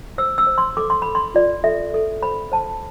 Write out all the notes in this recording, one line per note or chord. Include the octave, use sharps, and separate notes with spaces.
C5 E6
E6
C5
C6
A4 D6
C6
A4 B5
C6
F4 D5
A4 E5
A4
C5 B5
C5 A5